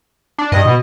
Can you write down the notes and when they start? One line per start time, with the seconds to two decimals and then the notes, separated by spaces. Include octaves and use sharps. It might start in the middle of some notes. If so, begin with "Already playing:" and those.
0.39 D4
0.52 G2 D#5
0.65 B2